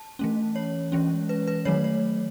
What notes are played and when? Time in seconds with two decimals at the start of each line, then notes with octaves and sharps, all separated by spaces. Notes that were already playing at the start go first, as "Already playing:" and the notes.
Already playing: A5
0.19 E3 A3 C#4
0.56 C#5
0.92 E3 G#3 C#4
1.29 B4
1.47 B4
1.65 D#3 F#3 A3 C#5
1.84 C#5